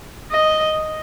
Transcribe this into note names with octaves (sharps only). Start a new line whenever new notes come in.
D#5